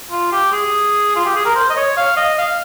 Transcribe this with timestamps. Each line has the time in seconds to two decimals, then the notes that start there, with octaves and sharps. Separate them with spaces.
0.11 F4
0.32 G4
0.52 G#4
1.16 F4
1.25 G4
1.35 G#4
1.45 A#4
1.55 C5
1.70 D#5
1.76 C#5
1.97 F5
2.17 D#5
2.38 F5